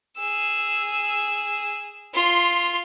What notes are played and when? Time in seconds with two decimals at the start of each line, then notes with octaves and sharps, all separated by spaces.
0.17 G#4 E6
2.14 F4 C6